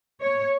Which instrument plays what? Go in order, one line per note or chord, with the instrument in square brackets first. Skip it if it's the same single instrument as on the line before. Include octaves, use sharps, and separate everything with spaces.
[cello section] C#5